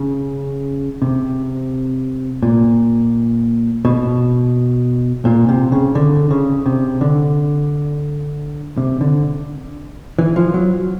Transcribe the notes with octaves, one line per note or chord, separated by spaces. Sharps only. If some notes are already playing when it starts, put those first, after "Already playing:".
Already playing: C#3
C3
A#2
B2
A#2
C3
C#3
D3
C#3
C3
D3
C3
D3
E3
F3
F#3